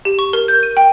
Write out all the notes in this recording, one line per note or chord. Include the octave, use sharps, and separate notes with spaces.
G4
C#6
A#4
G6
D#7
G5